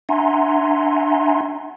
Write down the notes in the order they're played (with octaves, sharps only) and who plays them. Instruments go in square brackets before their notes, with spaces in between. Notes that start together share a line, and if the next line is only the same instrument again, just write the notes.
[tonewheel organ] D4 E5 F#5 G#5 A#5 C6